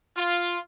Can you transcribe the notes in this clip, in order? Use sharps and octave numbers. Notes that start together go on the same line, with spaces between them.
F4